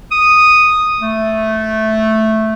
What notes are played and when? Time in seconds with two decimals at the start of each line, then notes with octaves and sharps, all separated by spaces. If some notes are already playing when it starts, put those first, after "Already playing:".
0.12 D#6
1.00 A3